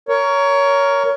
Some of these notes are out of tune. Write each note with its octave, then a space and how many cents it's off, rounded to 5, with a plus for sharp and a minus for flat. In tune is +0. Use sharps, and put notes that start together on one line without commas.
A#4 +0 C#5 +20